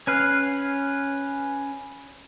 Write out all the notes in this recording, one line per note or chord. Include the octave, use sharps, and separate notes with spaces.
C#4 B4 F5